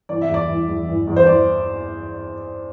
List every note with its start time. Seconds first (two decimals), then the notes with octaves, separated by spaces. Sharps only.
0.09 E3 D5
0.22 E5
0.30 E2 D5
0.49 E3
0.69 E2
0.88 E3
1.07 E2
1.16 C5
1.26 E3 D5